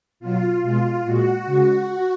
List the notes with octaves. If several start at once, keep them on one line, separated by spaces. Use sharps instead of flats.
B2 F#3 F4
B2 G#3 F4
A#2 G#3 F#4
C#3 G#3